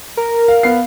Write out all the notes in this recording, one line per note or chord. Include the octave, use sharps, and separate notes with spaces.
A#4
F5
B3 F5 C7